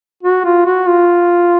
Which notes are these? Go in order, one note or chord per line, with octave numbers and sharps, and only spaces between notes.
F#4
F4
F#4
F4